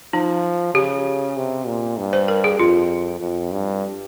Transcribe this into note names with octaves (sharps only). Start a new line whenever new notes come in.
F3 D#4
C#3 G4
C3
A#2
G2
C5
A#4
G#4
F2 F4
F2
G2